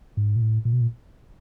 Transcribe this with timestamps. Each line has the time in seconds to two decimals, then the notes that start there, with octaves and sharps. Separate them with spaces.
0.17 G#2
0.36 A#2
0.42 A2
0.65 A#2
0.73 B2
0.81 A#2